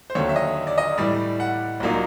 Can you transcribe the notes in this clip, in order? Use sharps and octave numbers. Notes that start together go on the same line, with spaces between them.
C5
D#2 D3 F#3 C#5
E5
D#5
D5
D#5
A2 E3 G3 D5
F#5
C2 A#2 F#3 A#3 D#4